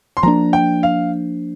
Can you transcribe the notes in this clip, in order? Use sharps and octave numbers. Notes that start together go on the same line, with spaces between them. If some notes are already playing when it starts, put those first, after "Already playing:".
C6
F3 A#3 D4 A#5
G5
F5